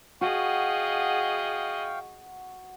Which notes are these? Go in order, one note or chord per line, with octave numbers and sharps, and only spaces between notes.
F#4 G#4 D#5 F5 G5 C#6